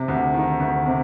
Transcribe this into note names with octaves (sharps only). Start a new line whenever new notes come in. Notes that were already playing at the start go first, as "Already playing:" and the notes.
Already playing: C3
D2
D#3
D2
C3